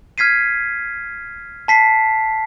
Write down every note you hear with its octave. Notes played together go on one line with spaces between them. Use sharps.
F6 G#6 B6 C7 D#7
A5 B6 C7